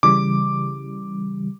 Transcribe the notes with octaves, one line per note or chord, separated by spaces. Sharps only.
C#3 E3 G3 D6